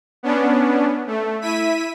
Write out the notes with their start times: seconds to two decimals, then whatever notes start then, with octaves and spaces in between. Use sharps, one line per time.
0.23 B3 C#4 D4
1.07 A3
1.41 E4 E5 B6 D#7